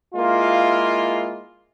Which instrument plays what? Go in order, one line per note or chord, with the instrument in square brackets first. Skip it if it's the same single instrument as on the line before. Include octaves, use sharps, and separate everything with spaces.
[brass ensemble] G#3 A#3 E4 F4